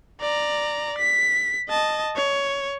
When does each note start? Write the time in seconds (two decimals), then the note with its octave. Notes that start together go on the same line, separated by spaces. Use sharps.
0.21 D5 A#5
0.98 B6
1.69 D#5 A5
2.16 C#5